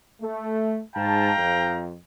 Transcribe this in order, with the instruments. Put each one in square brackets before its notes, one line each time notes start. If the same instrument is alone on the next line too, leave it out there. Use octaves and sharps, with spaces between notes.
[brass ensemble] A3
[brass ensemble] G#2 A5 [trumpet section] F5 G5 A#5
[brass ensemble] F2